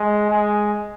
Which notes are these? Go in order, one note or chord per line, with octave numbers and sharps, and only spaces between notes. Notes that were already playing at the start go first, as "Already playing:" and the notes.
Already playing: G#3
G#3